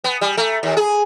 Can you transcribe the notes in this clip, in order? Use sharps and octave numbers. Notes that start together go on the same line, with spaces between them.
B3
G3
A3
D#2
G#4